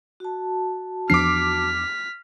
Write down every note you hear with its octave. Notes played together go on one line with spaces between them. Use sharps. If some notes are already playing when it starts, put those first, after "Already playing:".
F#4 A5
E2 F3 D4 D6 F6 B6 C7